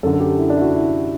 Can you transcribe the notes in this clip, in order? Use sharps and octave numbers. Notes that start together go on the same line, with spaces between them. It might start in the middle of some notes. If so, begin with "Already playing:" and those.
F#2 D3 A4
A4
G4
E4
D4
E4
F#4
E4